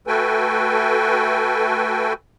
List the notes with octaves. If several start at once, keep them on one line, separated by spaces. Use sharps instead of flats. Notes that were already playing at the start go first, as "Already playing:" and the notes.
A3 F#4 A4 B4 G5 G#5